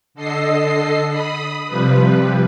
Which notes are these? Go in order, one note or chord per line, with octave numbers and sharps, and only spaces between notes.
D3 A4 D#5 C7
B5 D#6
C3 F3 G3 B4